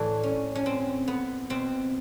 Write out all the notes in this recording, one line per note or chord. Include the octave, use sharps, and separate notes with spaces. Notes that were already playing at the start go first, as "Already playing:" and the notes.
Already playing: A2 E3 D4
C#4
C#4
C4
B3
B2 C4